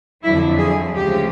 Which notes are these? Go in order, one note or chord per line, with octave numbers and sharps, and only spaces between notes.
F2 D3 F#3 E4
G#4
D2 C#3 F3 G#3 G4